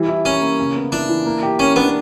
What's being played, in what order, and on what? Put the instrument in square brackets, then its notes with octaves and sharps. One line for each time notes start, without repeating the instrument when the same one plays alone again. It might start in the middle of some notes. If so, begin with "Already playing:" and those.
Already playing: [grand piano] E3 G3
E4
[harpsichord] C#4 [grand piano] A#4
[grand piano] A#3
C#3
B3
[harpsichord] D4 [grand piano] E4
[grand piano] E3
A#3
G4
[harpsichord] C#4 [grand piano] A#4
[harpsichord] B3 [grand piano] D4